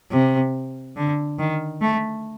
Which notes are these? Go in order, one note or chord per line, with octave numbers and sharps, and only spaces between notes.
C3
D3
D#3
A3